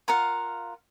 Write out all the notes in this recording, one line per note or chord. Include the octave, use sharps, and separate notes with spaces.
F4 A#4 F5 F#5